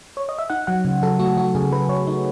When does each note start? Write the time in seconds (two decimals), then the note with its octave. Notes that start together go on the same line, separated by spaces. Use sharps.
0.17 C#5
0.29 D#5
0.39 E5
0.50 D#4 F#5
0.67 F#3 F#5
0.85 C#3
1.03 F#3 A4
1.19 A3 F#4
1.37 F#3 F#4
1.55 C#3 G#4
1.71 F#3 B4
1.89 C#3 C#5
2.07 D#4